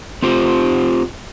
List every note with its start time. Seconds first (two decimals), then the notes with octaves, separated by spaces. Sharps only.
0.22 C4 F4 G4 C5